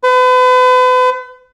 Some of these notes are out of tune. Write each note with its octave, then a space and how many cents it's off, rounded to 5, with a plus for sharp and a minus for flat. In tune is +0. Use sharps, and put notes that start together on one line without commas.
B4 +40